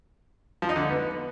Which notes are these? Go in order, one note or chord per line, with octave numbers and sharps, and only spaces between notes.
F3
D#4
D3
D#4
B3